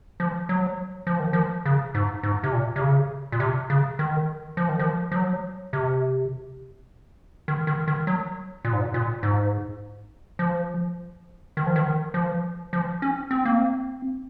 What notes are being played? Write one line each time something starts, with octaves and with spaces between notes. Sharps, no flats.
F3
F#3
F3
D#3
F3
C#3
G#2
G#2
C3
A#2
C3
C#3
A#2
C3
C#3
D#3
F3
D#3
F3
F3
F#3
C3
D#3
D#3
D#3
F#3
A#2
G#2
A#2
A#2
G#2
F3
D#3
F3
D#3
F3
F3
C#4
C4
A#3
C4